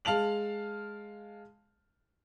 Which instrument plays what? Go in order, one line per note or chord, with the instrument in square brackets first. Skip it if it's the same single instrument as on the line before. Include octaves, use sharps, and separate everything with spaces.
[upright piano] G#3 F5 A5 F7 F#7